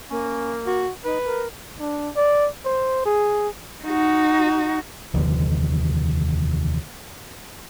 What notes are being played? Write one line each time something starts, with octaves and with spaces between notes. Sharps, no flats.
A#3 C#4
F#4
D#4 B4
A#4
D4
D5
C5
G#4
D#4 F#4
F1 D#2 D3 E3